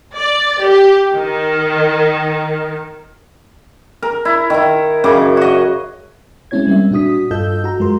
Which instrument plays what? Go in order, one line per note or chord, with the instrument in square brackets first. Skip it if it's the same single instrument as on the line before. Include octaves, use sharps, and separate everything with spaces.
[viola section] D5
G4
D#3
[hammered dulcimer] A#4
E4
D#3 E4
F#2 C#3 D6
F#4 D#5
[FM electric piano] G#3 C4 C#4 E4 C#5 G#6
G3 A#3 C4 E5
A#2 D4 F#4 D#6 B6
G2 F4 A4 D#5 E6 G6
F#4 A#5
F#2 G#3 F4 A#4 C6